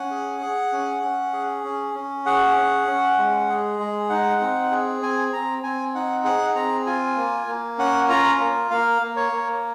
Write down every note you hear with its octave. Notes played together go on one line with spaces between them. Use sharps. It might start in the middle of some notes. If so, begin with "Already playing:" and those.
Already playing: C#4 F#5
G#4
G#4
C#4
C#4
G#4
C#4
C#4
G#4 F#5
C#4
C#4
G#3
G#4
G#3
D#4 F#5
C4
G#4
C4 G#5
C4 A#5
C4 G#5
D#4 F#5
G#4 F#5
C4 A#5
F4 G#5
A#3
A#3
C#4 F#5
F4 A#5
A#3
A#3 F5
A#3
C#5
A#3